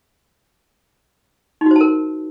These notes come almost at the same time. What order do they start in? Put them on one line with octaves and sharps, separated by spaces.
D#4 F#4 C5 A5 A#4